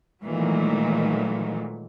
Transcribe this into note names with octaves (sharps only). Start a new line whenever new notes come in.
A#2 D#3 E3 F#3 G#3 A3